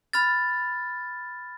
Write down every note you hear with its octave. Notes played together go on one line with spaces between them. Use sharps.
B5 F6 A6